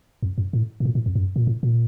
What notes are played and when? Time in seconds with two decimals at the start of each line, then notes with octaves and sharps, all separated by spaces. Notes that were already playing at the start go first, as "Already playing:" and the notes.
0.22 F2
0.38 F#2
0.53 A2
0.80 A2
0.85 A#2
0.95 A2
1.06 F2
1.15 F#2
1.36 A#2
1.47 A2
1.63 A#2